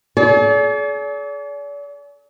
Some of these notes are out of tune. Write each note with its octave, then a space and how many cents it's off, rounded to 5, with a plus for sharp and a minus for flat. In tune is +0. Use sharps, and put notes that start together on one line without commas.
G#4 +45 D5 -40